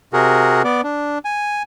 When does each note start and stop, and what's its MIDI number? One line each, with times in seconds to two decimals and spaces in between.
0.13 0.62 48
0.13 0.62 66
0.13 0.62 68
0.13 0.62 70
0.64 0.81 59
0.64 0.81 74
0.84 1.18 62
1.25 1.63 80